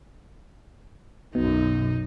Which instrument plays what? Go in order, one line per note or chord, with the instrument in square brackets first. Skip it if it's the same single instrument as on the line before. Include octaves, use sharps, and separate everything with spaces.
[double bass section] B1 F#2 [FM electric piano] B2 [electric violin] D#4